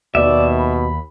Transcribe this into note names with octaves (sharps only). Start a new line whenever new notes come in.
D#2 B2 D5 E5
B5